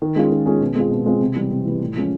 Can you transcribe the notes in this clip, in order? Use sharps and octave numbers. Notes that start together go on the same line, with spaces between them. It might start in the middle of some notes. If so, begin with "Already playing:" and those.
D#3
G#3 C#4 F4 G#4
D#3
G#3 C#4 F4 G#4
B2
G#3 C4 F4 G#4
B2
G#3 C4 F4 G#4
C3
E3 G3
C3
E3 G3
A2
F3 G#3 C#4